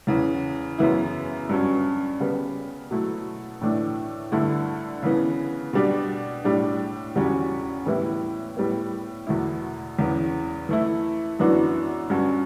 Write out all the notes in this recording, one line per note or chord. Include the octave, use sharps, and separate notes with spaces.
E2 C#3 E3
F#2 C#3 E3 B3 E4
G2 F#3 C#4
C#3 G3 B3
B2 F#3 A3 E4
A2 E3 A3 D4
G2 D3 A3 E4
C#3 E3 B3
B2 G3 D4
A2 G3 D4
E2 C#3 G3 C#4 F#4
A2 E3 G3 B3 E4
A2 G3 B3
E2 B2 A3 E4
E2 C#3 E3
E3 A3 E4
F#2 E3 B3 D4 F#4
G2 F#3 C#4 F#4